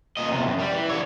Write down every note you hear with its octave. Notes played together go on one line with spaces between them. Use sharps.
A#2 D#5
E2 C3
F#2
G3
E3
D3 C#5